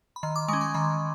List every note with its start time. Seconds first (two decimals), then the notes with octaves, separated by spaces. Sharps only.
0.16 B5
0.23 D#3 C6
0.36 D6
0.48 G#3 C#4 C#6
0.61 C6
0.74 D#3 B5